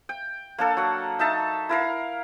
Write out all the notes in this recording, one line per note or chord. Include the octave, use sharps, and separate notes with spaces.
G5
A#3 D4 A4
F#3 F#5
D#4 E5 A5
E4 A#4 F5